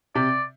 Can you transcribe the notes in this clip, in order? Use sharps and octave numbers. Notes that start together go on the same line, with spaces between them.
C3 D5